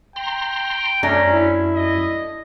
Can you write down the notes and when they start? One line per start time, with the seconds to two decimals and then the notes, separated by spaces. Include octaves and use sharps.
0.16 G5 A#5 C6
1.03 F#2 A3 C#4 D4 A#5
1.32 E4
1.75 D#5